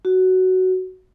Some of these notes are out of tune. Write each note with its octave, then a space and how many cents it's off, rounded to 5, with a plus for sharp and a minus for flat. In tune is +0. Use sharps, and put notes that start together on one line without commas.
F#4 +10